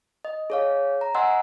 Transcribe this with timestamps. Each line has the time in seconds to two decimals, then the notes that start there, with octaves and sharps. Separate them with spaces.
0.25 D#5
0.50 G#4 C#5 F5
1.01 A#5
1.15 D#5 F#5 G#5 C6 E6